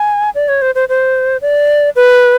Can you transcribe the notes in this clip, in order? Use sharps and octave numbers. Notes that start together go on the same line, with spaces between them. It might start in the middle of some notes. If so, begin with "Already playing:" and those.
Already playing: G#5
D5
C#5
C5
C5
C5
D5
B4